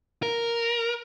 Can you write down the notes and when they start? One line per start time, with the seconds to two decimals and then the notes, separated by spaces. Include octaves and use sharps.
0.23 A#4